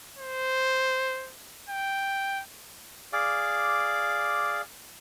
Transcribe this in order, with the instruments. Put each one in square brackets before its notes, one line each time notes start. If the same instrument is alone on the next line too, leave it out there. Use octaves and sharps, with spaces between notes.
[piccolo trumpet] C5
G5
[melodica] G#4 D5 F5 D6